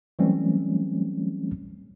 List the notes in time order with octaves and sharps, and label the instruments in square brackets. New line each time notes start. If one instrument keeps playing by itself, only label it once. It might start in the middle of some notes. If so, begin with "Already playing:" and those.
[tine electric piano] E3 F#3 G3 A3 C4 C#4